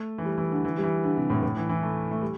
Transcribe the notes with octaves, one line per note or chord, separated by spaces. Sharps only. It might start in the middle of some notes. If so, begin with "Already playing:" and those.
Already playing: A3
E3
G3
E3
D3
E3
G3
E3
D3
C3
A2
A2
E3
E3
A3
A3
G3